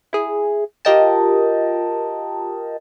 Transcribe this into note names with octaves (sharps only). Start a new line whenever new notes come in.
E4 G#4
F4 G4 A#4 D#5 G5 A5